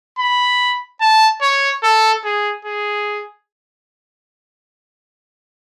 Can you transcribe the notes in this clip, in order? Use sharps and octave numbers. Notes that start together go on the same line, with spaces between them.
B5
A5
C#5
A4
G#4
G#4